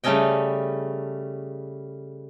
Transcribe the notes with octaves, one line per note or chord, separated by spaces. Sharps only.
C#3 G3 A3 C#4 D#5 G5